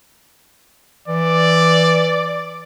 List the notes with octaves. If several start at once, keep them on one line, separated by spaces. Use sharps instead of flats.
E3 D5